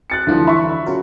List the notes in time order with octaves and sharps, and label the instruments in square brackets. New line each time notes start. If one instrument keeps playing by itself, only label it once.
[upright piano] F#6 A6 C#7
[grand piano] D2 F3 [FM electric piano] D3 E3 D4
[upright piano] E5 [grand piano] B5 C#6
[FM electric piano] C#3 F4 A#4 [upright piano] F#3